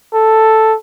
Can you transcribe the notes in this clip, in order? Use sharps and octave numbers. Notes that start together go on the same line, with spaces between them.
A4